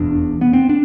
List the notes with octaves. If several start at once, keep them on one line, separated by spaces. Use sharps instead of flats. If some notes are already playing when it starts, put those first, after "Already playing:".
Already playing: F1 E2 B2 D4
B3
C4
D4